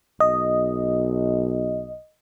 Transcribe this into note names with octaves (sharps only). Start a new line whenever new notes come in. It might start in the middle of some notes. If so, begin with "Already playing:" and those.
B1 D#5